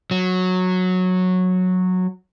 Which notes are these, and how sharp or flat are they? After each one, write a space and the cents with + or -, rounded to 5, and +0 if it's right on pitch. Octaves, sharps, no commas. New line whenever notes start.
F#3 -10